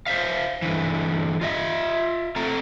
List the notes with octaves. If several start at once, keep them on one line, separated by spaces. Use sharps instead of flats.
C5 E5 F5
G2 D3 E3
F4 D#5 E5
A3 C4 A4 A#5